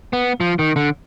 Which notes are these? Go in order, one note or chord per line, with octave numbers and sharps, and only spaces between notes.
B3
F3
D#3
D3